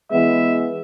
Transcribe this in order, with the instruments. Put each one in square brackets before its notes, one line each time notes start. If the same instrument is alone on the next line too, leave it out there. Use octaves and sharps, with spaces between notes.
[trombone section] E3 G#3 B3 [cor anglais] E5